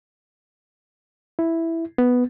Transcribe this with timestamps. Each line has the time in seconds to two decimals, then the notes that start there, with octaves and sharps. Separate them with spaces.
1.39 E4
1.98 B3